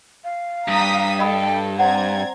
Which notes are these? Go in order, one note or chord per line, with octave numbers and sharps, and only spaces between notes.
F5
G2 A#5 D#6 B6
A4 D#5 G5 B5 D#6
C4 D5 F#5 A#5 G#6